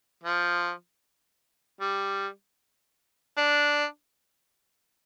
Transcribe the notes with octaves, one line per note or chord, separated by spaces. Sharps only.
F3
G3
D4